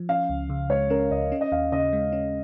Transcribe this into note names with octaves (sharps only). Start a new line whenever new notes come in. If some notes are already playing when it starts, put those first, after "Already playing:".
Already playing: F3
C#4 F5
C#2
C#3
G#3 C#5
C#4 A#4
C#2 D#5
C#4
D#5
D#2 F5
C#3 D#5
G#3
C#4